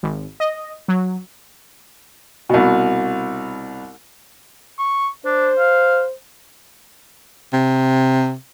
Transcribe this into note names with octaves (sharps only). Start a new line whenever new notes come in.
G#1
D#5
F#3
C2 B2
C#6
D4 C5
F5
C3